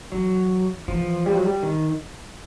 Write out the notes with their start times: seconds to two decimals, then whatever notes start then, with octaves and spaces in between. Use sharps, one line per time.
0.12 E3 F#3
0.88 E3 F3
1.26 G3
1.35 F#3
1.44 G3
1.63 D#3